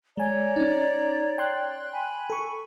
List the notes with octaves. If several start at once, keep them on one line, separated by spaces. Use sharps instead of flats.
G#3 C#5 D5 G#5 A#5
C#4 D#4
G5 C6 F#6
G#5 B5
A4 C#6